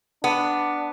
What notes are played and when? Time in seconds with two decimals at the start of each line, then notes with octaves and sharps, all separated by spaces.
0.24 B3 D4